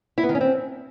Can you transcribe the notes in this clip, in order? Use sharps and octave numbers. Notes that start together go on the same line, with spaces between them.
E4
B3
D#3
C#4
C4